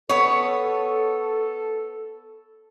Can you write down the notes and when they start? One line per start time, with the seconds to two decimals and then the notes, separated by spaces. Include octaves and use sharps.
0.09 B3 A4 C#5